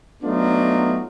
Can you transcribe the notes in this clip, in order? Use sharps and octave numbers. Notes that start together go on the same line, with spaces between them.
F#3 A3 B3 D4 D#4 F4